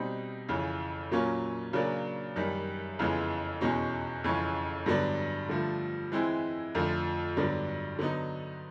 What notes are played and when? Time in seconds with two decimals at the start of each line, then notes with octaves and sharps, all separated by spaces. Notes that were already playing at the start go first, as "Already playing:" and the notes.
Already playing: B2 G3 C4 D#4
0.49 F2 C#3 E3
1.11 A#2 F#3 A#3 C#4 F4
1.73 C#3 F#3 A#3 D4
2.36 F#2 D#3 G3
2.99 F2 C#3 E3 G#3 B3
3.61 E2 B2 G#3 C#4 F#4
4.24 F2 C#3 E3 G#3 C#4
4.86 G2 D3 F#3 B3 D4
5.49 G2 D3 F3 A3
6.12 E3 G#3 C4 E4
6.75 F2 D3 F3 A3
7.37 G2 D3 F#3 B3 D4
7.99 D3 F#3 B3 D#4